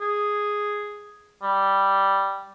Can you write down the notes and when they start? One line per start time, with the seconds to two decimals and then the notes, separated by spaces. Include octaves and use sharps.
0.01 G#4
1.43 G3